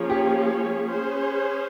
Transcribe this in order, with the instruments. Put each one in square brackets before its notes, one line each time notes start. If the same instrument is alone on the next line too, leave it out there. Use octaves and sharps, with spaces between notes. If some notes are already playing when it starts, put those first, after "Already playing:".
Already playing: [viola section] F3 A#3 C#4 G#4 C#5
[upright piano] G4
[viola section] C#4 G#4 C5